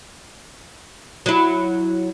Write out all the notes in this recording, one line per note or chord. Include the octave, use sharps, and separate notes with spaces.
F#3 E4